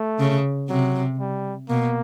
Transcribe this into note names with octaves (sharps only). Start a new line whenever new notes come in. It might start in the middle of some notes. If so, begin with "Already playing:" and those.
Already playing: A3
C#3
C3 F#3
G3
B2 A#3